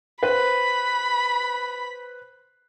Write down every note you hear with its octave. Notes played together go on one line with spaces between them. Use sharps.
B4 C5 B5